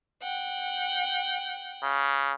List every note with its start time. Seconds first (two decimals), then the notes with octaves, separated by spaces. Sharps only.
0.22 F#5 G5
1.83 C#3